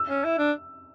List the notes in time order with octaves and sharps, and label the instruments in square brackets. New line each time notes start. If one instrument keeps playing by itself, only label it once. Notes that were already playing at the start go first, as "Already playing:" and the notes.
Already playing: [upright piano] E6
[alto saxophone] C#4
E4
D4